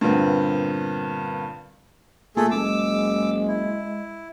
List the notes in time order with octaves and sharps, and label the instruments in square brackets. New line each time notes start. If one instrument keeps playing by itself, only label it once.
[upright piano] G2 A#2 D3 B3 C4
[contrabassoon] A#2 [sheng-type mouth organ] A3 G#4 A4
[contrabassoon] F#1 [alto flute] G#3 [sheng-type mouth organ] D6 E6
[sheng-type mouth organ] E4